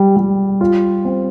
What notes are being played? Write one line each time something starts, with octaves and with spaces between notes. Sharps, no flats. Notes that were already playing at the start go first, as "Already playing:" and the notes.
Already playing: G3
G3
F4
C4